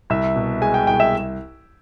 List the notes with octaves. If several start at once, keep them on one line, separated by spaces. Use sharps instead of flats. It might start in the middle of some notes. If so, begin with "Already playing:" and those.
C2 E5
B2
G#3 G#5
G5
C2 G5
E5